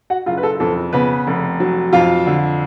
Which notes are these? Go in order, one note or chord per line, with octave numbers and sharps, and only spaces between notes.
F#4 F#5
F#1 F4 F5
B4
A4
F2 A4
C#3 B3 B4
F1
F#3
F2 F4 F5
D3